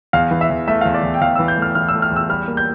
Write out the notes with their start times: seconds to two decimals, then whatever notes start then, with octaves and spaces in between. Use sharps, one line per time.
0.13 E2 F5
0.31 E3
0.41 E5
0.50 E2
0.68 A3 E5
0.81 F5
0.86 E2
0.94 D5
1.03 E2
1.14 G5
1.21 E2 F5
1.35 E6
1.39 E3
1.48 G6
1.57 A3 F6
1.75 E3 F6
1.89 E6
1.94 A3
2.02 F6
2.12 E2 E6
2.29 G3 F6
2.48 A#3
2.57 G6